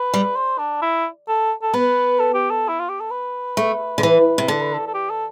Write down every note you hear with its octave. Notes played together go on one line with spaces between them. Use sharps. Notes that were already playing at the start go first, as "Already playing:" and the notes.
Already playing: B4
G3
C5
D4
E4
A4
A4
B3 B4
A4
G4
A4
E4
F4
G4
A4
B4
A3
D3
E3
C3
D3 A4
B4
A4
A4
G4
A4